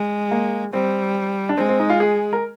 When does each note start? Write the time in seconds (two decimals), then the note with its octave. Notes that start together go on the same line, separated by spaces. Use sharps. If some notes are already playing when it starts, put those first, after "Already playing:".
Already playing: G#3
0.31 A#3
0.73 G3 C4
1.49 D4
1.57 G#3 C4
1.69 C4
1.80 D#4
1.90 F4
2.00 G#4
2.33 A#4